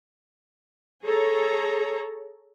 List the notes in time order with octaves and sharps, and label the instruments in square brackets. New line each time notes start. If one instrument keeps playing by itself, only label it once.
[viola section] G#4 A4 C#5 A#5